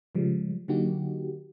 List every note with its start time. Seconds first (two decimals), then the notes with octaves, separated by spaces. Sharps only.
0.15 C#3 F3 G3 G#3
0.68 D3 F#3 A#3 D#4 F#4 G4